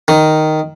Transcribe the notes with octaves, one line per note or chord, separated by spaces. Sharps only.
D#3